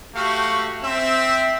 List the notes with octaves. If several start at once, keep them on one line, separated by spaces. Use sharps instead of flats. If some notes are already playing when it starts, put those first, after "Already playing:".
A3 F#4 G4 F5
C4 E5